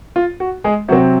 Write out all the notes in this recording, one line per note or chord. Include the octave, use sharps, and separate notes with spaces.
F4
F#4
G#3 G#4
C3 F#3 C4 F#4